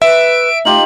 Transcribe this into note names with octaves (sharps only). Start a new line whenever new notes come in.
B4 E5 D7
A3 D#4 F4 G4 F#7